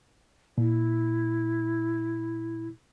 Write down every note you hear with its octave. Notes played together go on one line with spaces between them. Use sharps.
A#2 E4